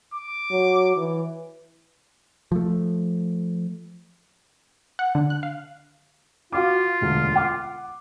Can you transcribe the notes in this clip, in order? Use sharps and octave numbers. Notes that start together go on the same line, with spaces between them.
D6
F#3
E3
F3 A3
F#5
D3
F#6
F5
F4 F#4 F5 D6
E1 D2 D3
F#5 D6